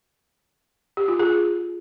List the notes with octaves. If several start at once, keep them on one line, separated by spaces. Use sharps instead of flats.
G4
F4
G#4